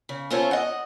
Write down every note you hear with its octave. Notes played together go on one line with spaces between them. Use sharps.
C#3
C#4 E4 F4 A4 C5 C#5
D#5 F#5